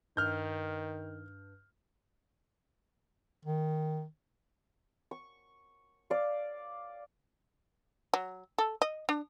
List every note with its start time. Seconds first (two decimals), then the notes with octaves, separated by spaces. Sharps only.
0.17 G2 D#3 F6 G6
3.45 D#3
5.11 C#6
6.10 D5 F5
8.14 F#3
8.58 A4
8.82 D#5
9.09 D4